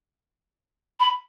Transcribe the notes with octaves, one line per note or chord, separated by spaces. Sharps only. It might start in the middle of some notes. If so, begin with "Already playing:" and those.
B5